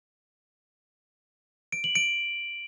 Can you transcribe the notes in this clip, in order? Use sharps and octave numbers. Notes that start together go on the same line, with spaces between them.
D7
F#7
D7